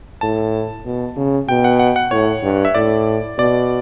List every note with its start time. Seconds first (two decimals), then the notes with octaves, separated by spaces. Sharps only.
0.21 A2 A5
0.85 B2
1.16 C#3
1.48 B2 G5
1.64 F#5
1.79 F#5
1.96 F#5
2.11 A2 C#5
2.43 G2
2.65 E5
2.75 A2 D5
3.38 B2 D5